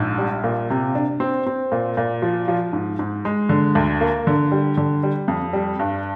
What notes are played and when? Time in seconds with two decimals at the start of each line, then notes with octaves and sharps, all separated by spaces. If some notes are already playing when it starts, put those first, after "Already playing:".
Already playing: A#1 G#2
0.18 G3
0.44 A#2
0.70 C3
0.95 D4
1.20 C4
1.46 C4
1.72 A#2
1.97 A#2
2.22 F3
2.48 F3
2.73 G#2
2.99 G#2
3.25 G#3
3.49 D3
3.75 D2
4.01 A#3
4.27 D3
4.52 G3
4.77 D3
5.03 G3
5.28 F2
5.53 G3
5.79 G2